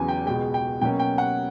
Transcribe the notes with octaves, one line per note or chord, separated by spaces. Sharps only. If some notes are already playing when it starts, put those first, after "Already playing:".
Already playing: E2 C#3 F#3 B3 G#5
G5
C#2 B2 G#3 G5
G5
B2 F#3 A#3 C#4 G5
G5
F#5